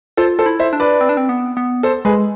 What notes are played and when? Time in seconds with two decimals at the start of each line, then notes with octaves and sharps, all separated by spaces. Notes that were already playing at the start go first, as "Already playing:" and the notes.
0.17 F4 A4 C5
0.39 A4 C5
0.46 E4
0.59 C5 E5
0.73 D4
0.80 B4 D5
1.01 C4
1.09 D4
1.17 C4
1.29 B3
1.57 B3
1.83 A4 C5
2.05 G#3 G#4 B4